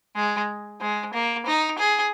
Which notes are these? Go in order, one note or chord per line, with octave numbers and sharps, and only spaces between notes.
G#3
G#3
A#3
D#4
G#4